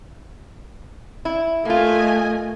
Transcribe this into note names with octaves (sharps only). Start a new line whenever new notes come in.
E4
A3 A#3 F4 D#5 G#5